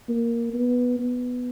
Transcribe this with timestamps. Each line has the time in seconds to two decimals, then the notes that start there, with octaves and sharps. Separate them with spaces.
0.09 A#3
0.54 B3
0.99 B3